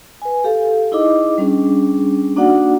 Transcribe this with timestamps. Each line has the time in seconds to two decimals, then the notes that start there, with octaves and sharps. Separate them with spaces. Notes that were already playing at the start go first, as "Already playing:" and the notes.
0.22 B4 G#5
0.44 G4 A4 F5
0.92 D#4 E4 G#4 D#5 D6
1.38 G3 C#4 D4 G#4
2.36 A#3 D4 D#4 F#4 D5 F#5